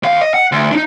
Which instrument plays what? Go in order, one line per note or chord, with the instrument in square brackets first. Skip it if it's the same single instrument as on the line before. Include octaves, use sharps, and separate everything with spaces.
[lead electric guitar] D#2 F5
D#5
F#5
D2
D4 D#4